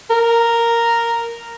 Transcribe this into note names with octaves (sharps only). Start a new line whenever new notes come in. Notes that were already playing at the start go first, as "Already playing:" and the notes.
A#4